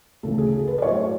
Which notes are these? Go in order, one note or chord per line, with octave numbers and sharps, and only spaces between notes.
D2 C#3 E3 A4
G#4
G#4
A4
B4
D5
A2 F#3 C#5
C#5